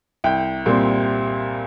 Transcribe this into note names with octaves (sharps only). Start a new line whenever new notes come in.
C2 G5
A#2 G3 C4